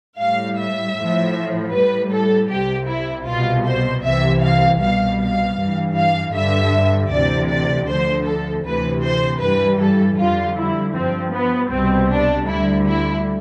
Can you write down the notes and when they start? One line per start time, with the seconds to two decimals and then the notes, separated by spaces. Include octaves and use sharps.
0.20 A2 G3 F5
0.59 E5
0.97 A2 F3
1.73 A2 G3 B4
2.12 A4
2.50 C2 C3 G3 G4
2.88 E4
3.27 C2 B2 G3 F4
3.65 C5
4.04 C2 C3 E3 E5
4.42 F5
4.80 C2 B2 G3 F5
5.19 F5
5.57 G2 E3 G3
5.95 F5
6.33 G2 D3 G3 E5
7.11 D2 C3 E3 D5
7.50 D5
7.87 D2 D3 F3 C5
8.26 A4
8.64 D2 C3 E3 B4
9.02 C5
9.41 G2 E3 G3 B4
9.80 A4
10.17 F2 D3 G3 F4
10.57 E4
10.94 G2 F3 C4
11.33 B3
11.71 C2 B2 G3 C4
12.10 D4
12.47 D2 D3 G3 E4
12.86 E4